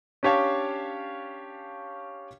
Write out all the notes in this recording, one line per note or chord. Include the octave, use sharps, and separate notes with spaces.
C#4 D4 G4 C#5 F5 A5